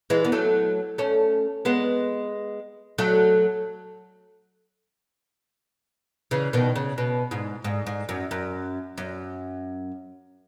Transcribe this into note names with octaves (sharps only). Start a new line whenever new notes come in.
E3 G#3
B3
F#3 A3
A3 C#4
G#3 B3
F#3 A3
C#3 E3
B2 D#3
C#3
B2
G#2
G#2
G#2
F#2
F#2
F#2